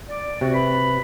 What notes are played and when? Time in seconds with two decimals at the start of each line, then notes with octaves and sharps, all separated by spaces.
0.09 D5
0.41 C3 F#4
0.53 B4 B5